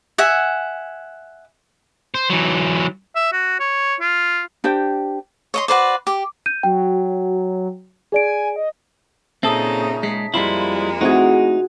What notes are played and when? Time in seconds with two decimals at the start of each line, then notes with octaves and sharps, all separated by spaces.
0.18 E5 F#5 G#5
2.14 C5
2.30 E3 F#3
3.15 E5
3.32 F#4
3.60 C#5
4.00 F4
4.64 D4 G4 C5 G5
5.54 C#5 D#5 C6
5.68 F#4 B4 C5 D5
6.07 G4
6.46 G6 D#7
6.63 F#3 G5
8.12 G#4 D5 G#5 D7
8.56 D#5
9.43 A#2 C#3 C4 D#4 A4 E5 A5 D#6
10.03 G#3 B6 C#7
10.34 F2 G3 G#3 A#3 C4 E4 F4 B5
11.01 A3 C4 D#4 E4 F#4 G#4